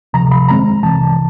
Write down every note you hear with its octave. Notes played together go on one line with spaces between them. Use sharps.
D2 C3 F3 A#5
B5
G2 D#3 G#3 C4 A#5
C2 C3 E3 A5